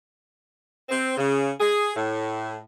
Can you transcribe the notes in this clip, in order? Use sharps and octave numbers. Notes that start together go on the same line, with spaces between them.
C4
C#3
G#4
A2